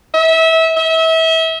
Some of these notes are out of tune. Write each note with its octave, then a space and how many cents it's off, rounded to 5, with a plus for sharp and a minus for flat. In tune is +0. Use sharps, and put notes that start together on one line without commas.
E5 -25
E5 -30